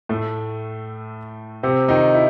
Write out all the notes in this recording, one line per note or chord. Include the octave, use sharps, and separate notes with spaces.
A2 A3
C3 C4
D#3 D#4
E4